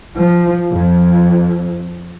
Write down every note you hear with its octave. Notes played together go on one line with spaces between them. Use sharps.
F3
F2